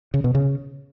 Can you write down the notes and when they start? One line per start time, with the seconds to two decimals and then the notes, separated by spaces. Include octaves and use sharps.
0.14 C#3
0.24 B2
0.35 C#3